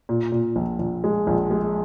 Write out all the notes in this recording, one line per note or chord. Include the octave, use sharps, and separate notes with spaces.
A#2
A#2
A#1
A#1
G#3
A#1
G#3